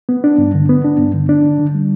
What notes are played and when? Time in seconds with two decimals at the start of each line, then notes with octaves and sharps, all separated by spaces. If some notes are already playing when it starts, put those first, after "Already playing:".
0.09 B3
0.24 D4
0.38 G2
0.54 D3
0.69 B3
0.84 D4
0.99 G2
1.14 D3
1.29 D4
1.44 D3
1.60 D3
1.75 G3